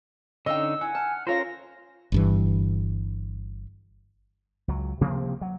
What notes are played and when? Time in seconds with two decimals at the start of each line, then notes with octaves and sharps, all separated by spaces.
0.46 D3 C#4 D#4 D#5 F5 G5 E6
0.81 E4 F#5 G#5
0.95 A5 F6
1.27 C#4 F4 A4 A#4 C5 C#5 F5 A#6
2.12 G1 G2 E3
4.68 C#2 F#3
5.01 C3 F3 A#3 C4
5.41 F#3